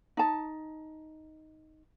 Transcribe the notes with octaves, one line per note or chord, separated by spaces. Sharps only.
D#4 A5